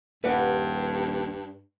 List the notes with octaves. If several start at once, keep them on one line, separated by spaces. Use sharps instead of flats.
D#1 G2 B4 D5 F#5